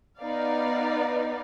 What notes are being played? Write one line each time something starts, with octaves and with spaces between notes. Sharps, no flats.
B3 D#4 D5 F5